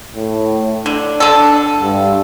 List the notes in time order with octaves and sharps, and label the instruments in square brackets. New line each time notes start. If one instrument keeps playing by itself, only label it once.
[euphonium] A2
[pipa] D3 [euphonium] D4
[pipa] D3 A4
[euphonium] G2